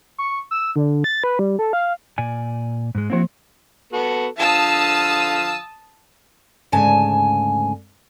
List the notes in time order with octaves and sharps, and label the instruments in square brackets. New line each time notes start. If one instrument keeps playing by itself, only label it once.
[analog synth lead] C#6
E6
D3
A6
B4
G3
A4
F5
[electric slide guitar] A#2 D5 G#5
G#2 G#3
[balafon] F3 A#3 [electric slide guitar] C4 E4 F#4
[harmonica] B3 F#4 A4
[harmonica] D3 F3 F5 [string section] A5 D#6 E6
[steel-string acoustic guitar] D2 G#2 C#3 G#5 A5